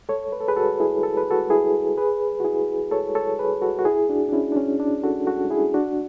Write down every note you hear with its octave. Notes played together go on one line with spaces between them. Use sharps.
A4 C#5
B4
A4
G#4 B4
F#4 A4
E4 G#4
A4
B4
F#4 A4
E4 G#4
G#4 B4
F#4
E4 G#4
A4 C#5
A4 C#5
G#4 B4
F#4 A4
F#4
E4 G#4
D4 F#4
D4
C#4 E4
D4
C#4
D4
F#4 A4
F#4 A4
E4 G#4
D4 F#4